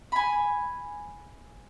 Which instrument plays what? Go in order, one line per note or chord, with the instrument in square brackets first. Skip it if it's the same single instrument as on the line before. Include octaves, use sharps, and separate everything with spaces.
[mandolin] G#5 B5